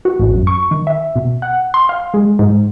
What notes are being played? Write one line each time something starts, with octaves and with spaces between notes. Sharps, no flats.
F#4
A1
F#2
C#6
D#3
E5
B2
F#5
C6
F5
G#3
G#2